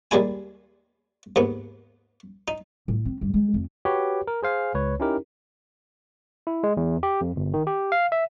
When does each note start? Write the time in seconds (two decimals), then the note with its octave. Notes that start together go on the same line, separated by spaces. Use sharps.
0.11 D#2 G3 G#3 E4 G#5
1.36 D#2 G#2 B3
2.48 D#4
2.88 A2
3.05 C4
3.21 G2
3.34 G#3
3.54 F2
3.85 F#4 G4 B4 C#5
4.27 A#4
4.43 G#4 C5 F5 G#5
4.74 C#2 B4 C#5
5.00 C#4 D#4 E4 G4 A#4
6.47 E4
6.63 G#3
6.77 E2
7.03 G4
7.21 F2
7.36 G1
7.54 D#3
7.67 G4
7.92 F5
8.12 E5